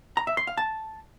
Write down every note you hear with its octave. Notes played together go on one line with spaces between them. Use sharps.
A#5
E5
C6
F5
A5